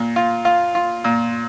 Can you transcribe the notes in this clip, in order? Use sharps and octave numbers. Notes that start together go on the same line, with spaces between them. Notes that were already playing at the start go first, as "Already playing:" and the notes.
Already playing: A#2
F4
F4
F4
A#2